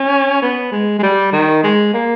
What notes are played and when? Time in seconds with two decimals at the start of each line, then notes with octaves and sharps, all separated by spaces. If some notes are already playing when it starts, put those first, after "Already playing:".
Already playing: C#4
0.42 B3
0.72 G#3
0.99 G#3
1.02 G3
1.32 D#3
1.63 G#3
1.94 A#3